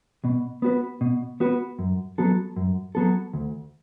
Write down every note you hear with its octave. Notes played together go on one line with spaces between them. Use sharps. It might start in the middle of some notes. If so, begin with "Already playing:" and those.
B2
B3 F#4 B4
B2
B3 F#4 B4
F#2
F#3 B3 F#4 A4
F#2
F#3 B3 F#4 A4
D2